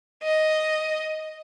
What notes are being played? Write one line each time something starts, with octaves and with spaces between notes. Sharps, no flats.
D#5